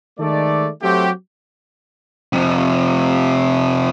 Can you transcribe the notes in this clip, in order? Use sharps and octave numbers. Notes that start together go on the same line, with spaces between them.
D#3 G#3 A3 A4 D5
F#3 A3 C4 F#4 G4
F2 C3